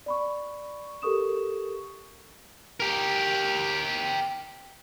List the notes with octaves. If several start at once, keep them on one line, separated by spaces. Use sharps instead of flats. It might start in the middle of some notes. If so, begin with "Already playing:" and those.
D5 B5 C#6
G4 A4 A#4 C#6 D#6 E7
G4 A#4